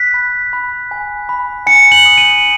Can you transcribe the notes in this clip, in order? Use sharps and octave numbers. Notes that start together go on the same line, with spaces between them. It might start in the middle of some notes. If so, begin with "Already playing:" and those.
Already playing: F#6 B6
B5
B5
G#5
B5
G#5 C#7
F#7
D#6
D#7